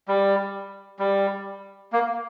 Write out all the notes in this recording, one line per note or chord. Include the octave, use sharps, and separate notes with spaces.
G3
G3
A#3